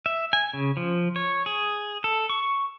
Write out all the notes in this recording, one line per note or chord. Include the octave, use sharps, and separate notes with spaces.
E5
G#5
C#3
F3
C#5
G#4
A4
C#6